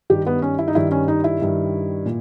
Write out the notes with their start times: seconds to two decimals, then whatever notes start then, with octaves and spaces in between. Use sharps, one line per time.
0.10 G2 D#3 G3 G4
0.26 B3
0.42 C#4
0.59 E4
0.68 D#4
0.75 G2 D#3 G3 E4
0.91 C#4
1.08 D#4
1.24 E4
1.40 G2 D#3 G3
2.06 A#2